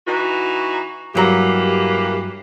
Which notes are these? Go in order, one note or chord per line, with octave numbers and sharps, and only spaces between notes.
E3 D#4 F#4
G2 E3 F#3 A#3 G4 A#5